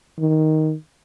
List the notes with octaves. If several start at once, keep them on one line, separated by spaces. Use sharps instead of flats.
D#3